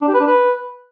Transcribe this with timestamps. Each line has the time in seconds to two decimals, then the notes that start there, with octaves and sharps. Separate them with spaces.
0.02 D4
0.08 G4
0.14 B4
0.20 D4
0.27 B4